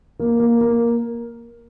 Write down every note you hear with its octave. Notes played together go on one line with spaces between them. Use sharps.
A#3
A#3
A#3